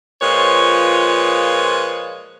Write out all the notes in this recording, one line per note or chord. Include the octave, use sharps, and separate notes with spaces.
A#2 F3 G#3 F4 B4 C#5